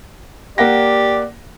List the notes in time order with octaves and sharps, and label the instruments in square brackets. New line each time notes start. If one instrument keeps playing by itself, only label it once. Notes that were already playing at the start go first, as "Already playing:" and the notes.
[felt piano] A#3 F#5 A#6 [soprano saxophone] G4 [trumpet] D5